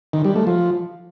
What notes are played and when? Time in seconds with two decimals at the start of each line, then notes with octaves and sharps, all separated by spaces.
0.13 D#3
0.25 G3
0.36 A3
0.47 F3